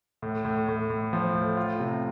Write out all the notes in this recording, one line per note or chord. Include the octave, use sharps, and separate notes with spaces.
A2
A2
A2
A2
F3
A2
F4
C3